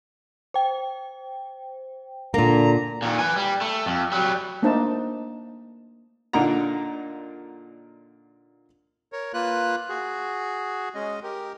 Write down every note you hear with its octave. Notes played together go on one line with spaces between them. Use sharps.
C5 G5
A#2 D3 A#3 A#5
A#2 D#3
B4 G#5
G3
A3
F2
F#3 G3
A3 A#3 D4 D#4 C5 A5
A#2 D3 A#3 D#4 F#5 A#5
A#4 C#5
A#3 F4 B4 F#6
F#4 G#4
G#3 C#4 D#5
G4 A#4